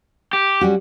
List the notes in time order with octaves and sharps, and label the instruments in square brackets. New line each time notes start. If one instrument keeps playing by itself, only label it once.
[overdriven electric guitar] G4
[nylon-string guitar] G3 C#4 F#4